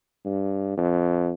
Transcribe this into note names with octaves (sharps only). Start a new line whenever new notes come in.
G2
F2